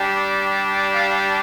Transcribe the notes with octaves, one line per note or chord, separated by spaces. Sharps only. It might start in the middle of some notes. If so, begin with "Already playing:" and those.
Already playing: G3 D4 G4
F5